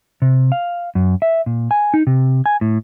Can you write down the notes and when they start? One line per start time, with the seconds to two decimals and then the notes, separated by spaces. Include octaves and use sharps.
0.22 C3
0.52 F5
0.95 F#2
1.22 E5
1.46 A#2
1.71 G#5
1.94 D#4
2.07 C3
2.46 G#5
2.61 A2